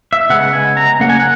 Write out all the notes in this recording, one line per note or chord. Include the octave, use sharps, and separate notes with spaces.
E5
C#3 G#3 B3 F#5
G#5
A#5
C#3 F#3 A#3 C#4 F#5
G#5
F#5